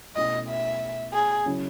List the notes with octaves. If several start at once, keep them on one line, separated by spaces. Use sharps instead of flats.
B2 A3 C#4 E4 D#5
E5
G#4
C#3 F#3 C#4 E4